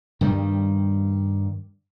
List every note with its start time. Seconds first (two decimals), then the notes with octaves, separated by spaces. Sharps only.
0.21 G2 D#3 G3